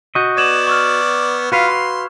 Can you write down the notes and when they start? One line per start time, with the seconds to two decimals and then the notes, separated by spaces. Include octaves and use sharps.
0.15 F#4 D#5 C#6 G6
0.37 B3 D5 G#6 E7 F#7
0.67 C#6 E6 F6
1.52 F4 F#4 B4 F5
1.68 C6